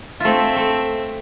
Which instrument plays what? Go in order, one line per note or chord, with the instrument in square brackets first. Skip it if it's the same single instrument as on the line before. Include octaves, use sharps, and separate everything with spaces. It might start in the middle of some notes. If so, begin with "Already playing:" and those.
[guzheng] A3 F4 [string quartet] C4 E5
[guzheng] A3